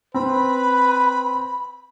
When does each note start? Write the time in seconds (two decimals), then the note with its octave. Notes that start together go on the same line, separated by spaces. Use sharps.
0.14 C4 B4 B5